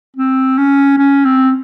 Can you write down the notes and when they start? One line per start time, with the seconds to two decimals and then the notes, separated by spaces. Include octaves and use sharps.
0.16 C4
0.58 C#4
0.98 C#4
1.25 C4